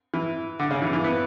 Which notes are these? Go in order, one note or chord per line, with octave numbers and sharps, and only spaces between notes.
E3
D3
C#3
E3
E3
B3